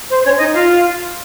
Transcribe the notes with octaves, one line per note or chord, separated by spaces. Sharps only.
C5
C5
C#4 C#5
D#4 D#5
F4 F5